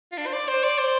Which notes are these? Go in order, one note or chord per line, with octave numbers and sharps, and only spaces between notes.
F4
D4
C5
D5
C5
D5
C5